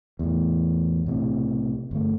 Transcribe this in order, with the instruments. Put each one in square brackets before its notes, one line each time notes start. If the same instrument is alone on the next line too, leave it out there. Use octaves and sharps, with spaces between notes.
[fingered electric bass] E2 A2
B1 A2 C3
G1 A3